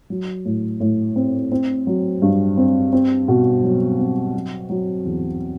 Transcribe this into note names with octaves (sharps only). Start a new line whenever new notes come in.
F#3
A2
A2
C4
C4
F#3
G2
C4
C4
B2
F#3
C4
F#3
F#3
E2